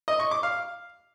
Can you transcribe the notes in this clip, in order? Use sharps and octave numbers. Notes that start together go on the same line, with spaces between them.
D#5
C#6
D6
F5